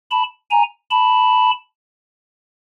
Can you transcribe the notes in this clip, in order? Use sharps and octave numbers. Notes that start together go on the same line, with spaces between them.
A5 B5
G#5 A#5
A5 B5